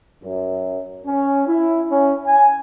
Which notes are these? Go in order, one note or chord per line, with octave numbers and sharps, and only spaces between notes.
F#2
C#4
E4
C#4
G#5